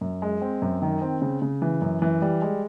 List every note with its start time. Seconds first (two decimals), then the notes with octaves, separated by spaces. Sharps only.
0.01 F#2
0.22 G#3
0.41 C4
0.62 F#2
0.82 D#3
1.02 C4
1.22 C#3
1.42 C#3
1.62 E3
1.81 F#2
2.02 E3
2.22 G3
2.42 G#3